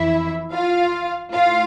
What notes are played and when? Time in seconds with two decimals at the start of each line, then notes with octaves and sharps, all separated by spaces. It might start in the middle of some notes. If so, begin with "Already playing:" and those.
Already playing: F2 E3 E4 E5
0.52 F4 F5
1.33 A2 F4 F5